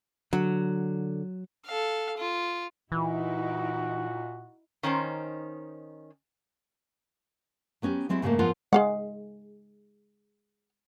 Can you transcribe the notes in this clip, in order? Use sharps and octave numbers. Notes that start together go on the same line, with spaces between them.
D3 F#3
A4 F5
F4
A#2 E3 D#4 E4 F#4
D#3 C#4 D#4 C5
F#3 B3 C#4 F#4 G4
F#3 G#3 C4 E4 F#4
G#2 C#3 F#3 G3 A3 A#3
G#2 F3 B3 F4 A#4 F#5
G#3 G#4 F5 F#5